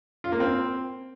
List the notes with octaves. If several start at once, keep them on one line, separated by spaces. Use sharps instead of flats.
F4
A#3
C4